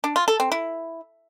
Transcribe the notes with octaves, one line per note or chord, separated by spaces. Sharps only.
D4
F4
A4
C4
E4